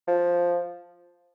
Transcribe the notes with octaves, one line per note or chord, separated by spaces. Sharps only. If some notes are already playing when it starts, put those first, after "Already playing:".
F3